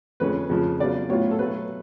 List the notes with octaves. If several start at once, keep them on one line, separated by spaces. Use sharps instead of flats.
F2 D3 G#3 C#4 B4
F2 C#3 F3 G#3
C#3 F#3 B3 F4 D5
A2 F#3 B3 F4 C#5
A4
B2 F#3 A3 B4